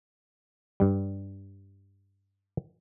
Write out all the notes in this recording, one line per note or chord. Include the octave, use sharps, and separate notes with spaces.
G2 G3